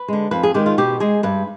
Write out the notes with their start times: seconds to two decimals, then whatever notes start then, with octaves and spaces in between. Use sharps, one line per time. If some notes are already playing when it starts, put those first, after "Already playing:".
Already playing: B4
0.08 D3 G#3
0.31 F2 B4
0.43 G#4
0.54 D#3 G#3 G4
0.66 F4
0.78 B2 G4
1.00 G#3 G#4
1.23 G2 B4